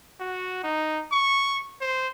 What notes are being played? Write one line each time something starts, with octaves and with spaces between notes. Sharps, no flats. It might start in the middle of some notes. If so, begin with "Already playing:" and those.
F#4
D#4
C#6
C5